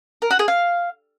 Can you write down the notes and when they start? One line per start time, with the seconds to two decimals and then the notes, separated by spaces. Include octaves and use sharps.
0.22 A#4
0.31 F#4
0.39 G#4
0.48 F5